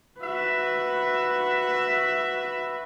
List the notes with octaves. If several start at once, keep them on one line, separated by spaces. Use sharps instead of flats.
F#4 B4 E5